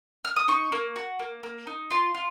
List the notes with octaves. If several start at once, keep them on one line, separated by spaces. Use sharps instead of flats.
F6
D#6
D#4 C#6
A#3
F#4
A#3
A#3
D#4
F4 C6
F4